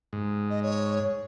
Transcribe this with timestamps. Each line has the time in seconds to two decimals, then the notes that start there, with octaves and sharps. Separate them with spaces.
0.13 G#2
0.50 D#5
0.63 C#5